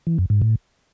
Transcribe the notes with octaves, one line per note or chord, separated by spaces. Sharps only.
E3
F#2
G#2
A2